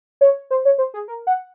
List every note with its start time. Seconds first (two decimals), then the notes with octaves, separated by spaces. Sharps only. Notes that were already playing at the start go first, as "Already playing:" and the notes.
0.21 C#5
0.51 C5
0.65 C#5
0.78 C5
0.94 G#4
1.08 A#4
1.27 F#5